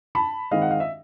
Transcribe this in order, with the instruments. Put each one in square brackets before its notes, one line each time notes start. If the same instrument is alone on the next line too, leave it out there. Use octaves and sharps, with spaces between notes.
[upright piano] A5 B5
D#3 G#3 C4 D#5 F5
F#5
F5
E5